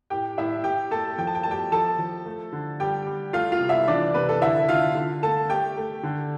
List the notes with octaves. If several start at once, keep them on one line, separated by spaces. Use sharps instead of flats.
A2 G4 G5
A2 E4 E5
A2 G4 G5
A3 A4 A5
F3 G5
A5
G5
A3 A5
G4 G5
F3 A4 A5
F3
A3
D3
G3 G4 G5
G3
A3 F4 F5
F4 F5
C3
E4 E5
E3 D4 D5
C3 B4
A4
D3 E4 E5
D3 F4 F5
D3
A3 A4 A5
A3 G4 G5
A3
D3